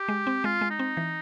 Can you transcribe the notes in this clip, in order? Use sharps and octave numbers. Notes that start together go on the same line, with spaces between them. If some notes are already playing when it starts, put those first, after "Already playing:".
Already playing: G4
G#3
C4
G#3 F4
G#3
D#4
C4
E3